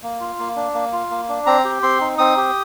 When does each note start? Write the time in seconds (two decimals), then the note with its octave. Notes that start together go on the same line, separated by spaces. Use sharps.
0.03 A#3
0.20 F4
0.39 A#3
0.56 D4
0.74 A#3
0.93 F4
1.11 A#3
1.29 D4
1.46 C4 A#5
1.65 G4
1.83 C4 C6
2.01 D#4
2.18 C4 D#6
2.37 G4